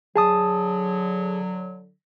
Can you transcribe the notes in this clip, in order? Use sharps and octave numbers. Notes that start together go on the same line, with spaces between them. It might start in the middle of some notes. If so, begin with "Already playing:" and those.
D3 F#3 G#4 A5 D#6